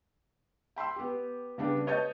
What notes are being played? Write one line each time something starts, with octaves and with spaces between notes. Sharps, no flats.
G5 B5 C6 E6
B3 G4
C#3 G3 B3 D4
B4 C#5 D#5 A5 G6 A6